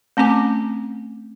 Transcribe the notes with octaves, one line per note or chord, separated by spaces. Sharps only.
A3 C4 C#4 G#5 D6